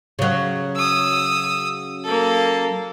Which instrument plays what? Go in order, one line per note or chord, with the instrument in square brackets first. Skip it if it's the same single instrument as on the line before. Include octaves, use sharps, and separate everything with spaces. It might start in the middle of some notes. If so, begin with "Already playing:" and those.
[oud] C#3 F#3
[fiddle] D#6 E6
A#3 A4